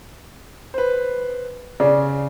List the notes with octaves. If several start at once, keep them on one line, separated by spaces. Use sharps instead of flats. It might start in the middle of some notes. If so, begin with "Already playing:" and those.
B4 C5
C#3 D5